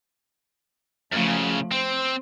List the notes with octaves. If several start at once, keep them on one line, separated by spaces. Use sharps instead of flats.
F#2 C#3 F3 A3
C4 C5